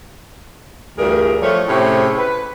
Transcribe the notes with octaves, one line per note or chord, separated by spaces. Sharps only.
D2 G2 E3 G#4 A#4
F3 G3 A3 C#5
A2 C3 C#4 G#4 C5
B4